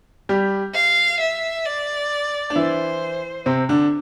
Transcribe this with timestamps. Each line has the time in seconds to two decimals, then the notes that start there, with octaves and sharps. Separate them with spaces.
0.29 G3 G4
0.74 F5
1.20 E5
1.66 D5
2.50 D4
2.55 E3 E4 C5
3.46 C3 C4
3.69 D3 D4